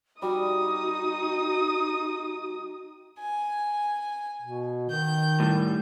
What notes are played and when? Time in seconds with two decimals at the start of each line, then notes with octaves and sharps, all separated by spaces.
0.22 G3 D#4 F#4 D#6
3.19 G#5
4.42 B2
4.90 D#3 G6
5.40 A2 G3